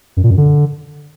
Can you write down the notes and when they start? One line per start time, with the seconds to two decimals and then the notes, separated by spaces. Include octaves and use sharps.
0.17 F#2
0.24 A#2
0.31 F#2
0.37 D3